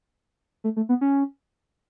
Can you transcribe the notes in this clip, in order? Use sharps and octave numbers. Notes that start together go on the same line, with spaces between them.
A3
A3
B3
C#4